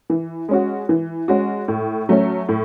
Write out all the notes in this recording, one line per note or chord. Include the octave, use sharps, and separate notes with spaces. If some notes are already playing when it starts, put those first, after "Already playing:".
E3
G#3 C#4 F#4
E3
G#3 C#4 F#4
A2
F#3 A3 C#4
A2